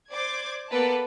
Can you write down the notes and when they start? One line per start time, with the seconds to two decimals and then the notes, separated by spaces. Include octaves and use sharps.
0.12 C5 D5 D6 G#6
0.69 A#3 B3 A4 B4 D5 A5